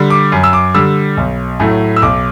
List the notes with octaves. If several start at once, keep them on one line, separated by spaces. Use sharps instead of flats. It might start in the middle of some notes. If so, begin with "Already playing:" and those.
Already playing: D3 G3
D6
F#2
E6
D6
D3 G3 E6
B1
A2 F#3 A3
E6
B1 D6